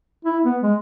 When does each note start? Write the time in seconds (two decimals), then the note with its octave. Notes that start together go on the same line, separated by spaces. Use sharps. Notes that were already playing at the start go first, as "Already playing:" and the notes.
0.25 E4
0.45 B3
0.62 G#3